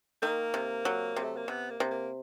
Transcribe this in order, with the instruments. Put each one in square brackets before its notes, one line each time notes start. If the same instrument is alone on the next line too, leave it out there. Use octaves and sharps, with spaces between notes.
[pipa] D#3 [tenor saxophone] A#3
[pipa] C3
F#3
C3
[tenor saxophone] A3
A#3
[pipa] C3 [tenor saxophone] B3
[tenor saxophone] A#3
[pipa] C3
[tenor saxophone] A#3